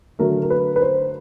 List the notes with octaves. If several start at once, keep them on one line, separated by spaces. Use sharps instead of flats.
D3 F#3 A3 A#4
A#4
B4
B4
C5